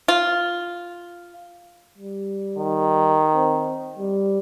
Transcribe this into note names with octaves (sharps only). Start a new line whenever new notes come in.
F4
G3
D#3
C4
G3